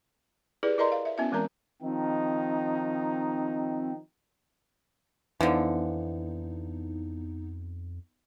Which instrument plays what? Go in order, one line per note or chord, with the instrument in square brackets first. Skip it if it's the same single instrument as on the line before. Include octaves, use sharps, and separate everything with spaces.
[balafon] E4 G4 G#4 B4 D5
E4 A#4 D5 D#5 A#5 C6
F5
E5
B3 C#4 E4 F#4 E5
E3 G#3 C4 A#4 A#5
[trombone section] D#3 F3 D#4 [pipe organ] C4
[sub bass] F2 [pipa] D3 F3 [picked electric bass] E3 [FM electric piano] B3 D#4